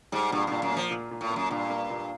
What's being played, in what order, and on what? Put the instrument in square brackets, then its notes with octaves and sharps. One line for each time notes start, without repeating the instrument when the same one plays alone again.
[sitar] G#2 [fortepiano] G3
[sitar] G2 [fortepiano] A#2
[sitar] G2 [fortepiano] A#2
[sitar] F#2
[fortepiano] A#3
[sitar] F3
[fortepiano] A#2
A#2
[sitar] A2
[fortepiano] A#3
[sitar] F#2
[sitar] G2 [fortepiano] A#2
[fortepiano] A#3
A#2